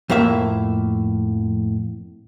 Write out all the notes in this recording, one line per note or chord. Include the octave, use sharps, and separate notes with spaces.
F2 A2 A#3 E5